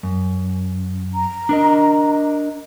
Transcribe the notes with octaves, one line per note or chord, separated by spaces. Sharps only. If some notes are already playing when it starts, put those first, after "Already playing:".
F#2
A#5
D4 A#4 D#5